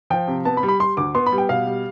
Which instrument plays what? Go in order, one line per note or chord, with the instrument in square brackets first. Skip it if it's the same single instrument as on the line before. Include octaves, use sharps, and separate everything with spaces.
[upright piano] F3 G5
C3
B3 A5
B5
G3
B5
G3 C6
D2 D6
B3 C6
B5
G3
G5
B2 F5
G3